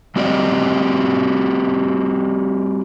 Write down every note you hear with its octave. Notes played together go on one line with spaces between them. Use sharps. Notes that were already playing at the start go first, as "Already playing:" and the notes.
G3 C4 F#4 G4 D5 D#5